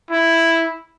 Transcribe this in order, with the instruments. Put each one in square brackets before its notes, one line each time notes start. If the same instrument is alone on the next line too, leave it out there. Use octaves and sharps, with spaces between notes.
[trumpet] E4